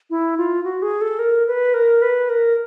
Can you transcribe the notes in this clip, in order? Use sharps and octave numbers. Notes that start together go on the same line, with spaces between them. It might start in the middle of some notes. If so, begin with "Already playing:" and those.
E4
F4
F#4
G#4
A4
A#4
B4
A#4
B4
A#4